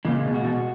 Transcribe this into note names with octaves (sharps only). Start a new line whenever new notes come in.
A#2 C#3 G#3
B2
F#4
B2